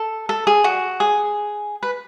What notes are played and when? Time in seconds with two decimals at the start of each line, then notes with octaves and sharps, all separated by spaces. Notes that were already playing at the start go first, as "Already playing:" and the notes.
Already playing: A4
0.29 A4
0.47 G#4
0.64 F#4
1.00 G#4
1.83 B4